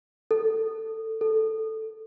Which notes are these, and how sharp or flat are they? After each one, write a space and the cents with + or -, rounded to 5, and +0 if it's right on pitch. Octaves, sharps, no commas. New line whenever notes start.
A4 +10
A4 +0